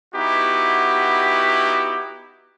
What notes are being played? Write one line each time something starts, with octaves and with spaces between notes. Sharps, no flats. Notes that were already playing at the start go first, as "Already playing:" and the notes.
B3 D#4 E4 F#4 G4